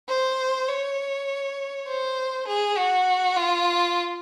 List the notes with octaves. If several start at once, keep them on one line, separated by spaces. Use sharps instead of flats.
C5
C#5
C5
G#4
F#4
F4